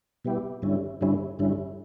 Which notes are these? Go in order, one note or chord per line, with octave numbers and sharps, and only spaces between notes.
B2 G3 B3 E4 G4
G2 D3 G3 C#4 E4
G2 D3 G3 C#4 E4
G2 D3 G3 C#4 E4